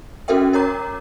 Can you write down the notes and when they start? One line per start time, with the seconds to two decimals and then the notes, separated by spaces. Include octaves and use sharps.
0.28 C#4 F#4 A4 A#4 E5 G5
0.53 A#4 C#5 A#5 D6